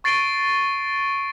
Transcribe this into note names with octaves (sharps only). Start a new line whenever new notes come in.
C#6 A6 C7 D7 D#7 G7